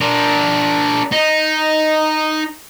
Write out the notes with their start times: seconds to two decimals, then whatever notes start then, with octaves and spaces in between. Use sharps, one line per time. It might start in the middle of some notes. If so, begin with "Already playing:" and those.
0.01 D4 A#4
1.12 D#4